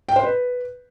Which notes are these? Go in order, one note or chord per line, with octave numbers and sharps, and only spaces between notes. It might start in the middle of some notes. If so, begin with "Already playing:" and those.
G5
C5
B4